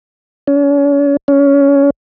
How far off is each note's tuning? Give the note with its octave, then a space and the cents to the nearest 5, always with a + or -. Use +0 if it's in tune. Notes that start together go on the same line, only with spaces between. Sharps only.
C#4 +40
C#4 +20